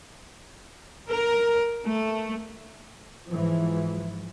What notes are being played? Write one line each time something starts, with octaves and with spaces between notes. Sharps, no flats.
A#4
A3
G#2 E3 F3